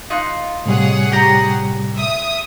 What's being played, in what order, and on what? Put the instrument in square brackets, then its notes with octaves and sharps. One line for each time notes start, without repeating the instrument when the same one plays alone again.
[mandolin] D#4 F4 F#6
[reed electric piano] A2 C3 G3 [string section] G#4 C#5 F#5
[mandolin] G4 G5 A#5
[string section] E5 D#6